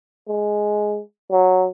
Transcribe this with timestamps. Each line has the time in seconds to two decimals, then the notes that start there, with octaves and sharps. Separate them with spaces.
0.28 G#3
1.31 F#3